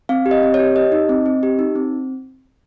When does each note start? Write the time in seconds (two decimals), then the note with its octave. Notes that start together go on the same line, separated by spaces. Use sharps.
0.09 C4 F5
0.26 G4
0.31 D#5
0.43 C4
0.54 C#5
0.59 G4
0.76 G4 D#5
0.92 D#4
1.09 C4
1.26 C4
1.43 G4
1.59 D#4
1.75 C4